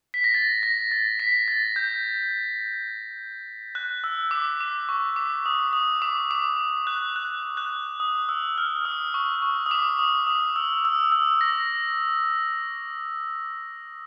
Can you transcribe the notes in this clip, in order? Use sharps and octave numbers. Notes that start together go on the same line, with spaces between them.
B6
A#6
A6
A#6
A6
B6
A6
G6
F#6
E6
D6
D6
C#6
D6
D#6
D#6
D6
D6
F#6
F#6
F#6
D#6
E6
F6
D#6
C#6
C#6
D#6
D6
D#6
D#6
E6
E6
E6
A#6